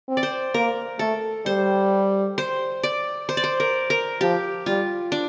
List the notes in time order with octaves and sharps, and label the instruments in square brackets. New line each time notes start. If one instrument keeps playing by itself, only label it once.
[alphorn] C4
[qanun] D5
C5
[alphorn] A#3 [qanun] A#4
[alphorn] A3 [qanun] A4
[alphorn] G3 [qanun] C5
[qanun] C5
D5
C5
D5
C5
A#4
A#4
[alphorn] F3 [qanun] G4
[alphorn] G3 [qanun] F4
[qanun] D4